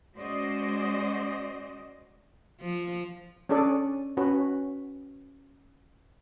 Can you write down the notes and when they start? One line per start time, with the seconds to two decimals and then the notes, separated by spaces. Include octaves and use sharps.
0.15 G#3 C#4 F#4 C5 D5 D#5
2.60 F3
3.49 C#4 D4 G#4 A4 D5
4.17 C#4 F#4 B4